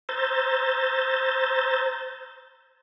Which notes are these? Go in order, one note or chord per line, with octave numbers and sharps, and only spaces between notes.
C5 A#5 E6 G6 A6